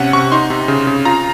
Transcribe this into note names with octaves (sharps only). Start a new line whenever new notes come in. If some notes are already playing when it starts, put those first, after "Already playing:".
Already playing: C3 C#4 F#5
C3 C#6
D#4 C6
C3
C#3
C#3
F4 A#5